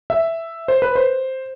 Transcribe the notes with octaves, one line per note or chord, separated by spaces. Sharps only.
E5
C5
B4
C5